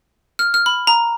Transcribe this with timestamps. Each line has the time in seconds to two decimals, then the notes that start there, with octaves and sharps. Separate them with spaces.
0.39 F6
0.54 F6
0.66 B5
0.87 A#5